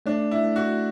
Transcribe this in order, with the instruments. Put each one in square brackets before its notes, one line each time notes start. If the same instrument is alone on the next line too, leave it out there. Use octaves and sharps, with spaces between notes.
[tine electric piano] A3 [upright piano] D4
[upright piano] E4
[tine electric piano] A3
[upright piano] F#4